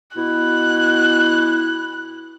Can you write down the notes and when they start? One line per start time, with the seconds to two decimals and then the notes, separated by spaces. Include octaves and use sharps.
0.16 B2 E4 F#6